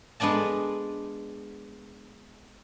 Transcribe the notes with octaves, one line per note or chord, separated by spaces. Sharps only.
G#3 B3 D4 D5 A5